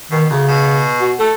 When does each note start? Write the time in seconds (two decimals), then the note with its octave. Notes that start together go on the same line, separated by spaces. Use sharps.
0.11 B2 D#3
0.30 D2 C#3
0.48 B2
1.00 F#4
1.19 A3 A4